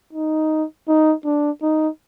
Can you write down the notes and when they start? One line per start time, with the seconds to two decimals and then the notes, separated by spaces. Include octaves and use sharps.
0.13 D#4
0.88 D#4
1.25 D4
1.62 D#4